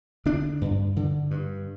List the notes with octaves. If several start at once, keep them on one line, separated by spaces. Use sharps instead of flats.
D3 D4
G2
D3
G2